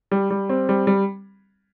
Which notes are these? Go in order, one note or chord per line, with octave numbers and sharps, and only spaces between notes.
G3
G3
C4
G3
G3